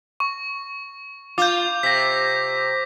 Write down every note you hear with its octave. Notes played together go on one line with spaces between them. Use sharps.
C#6
F4 D6 G6
C3 A#6 B6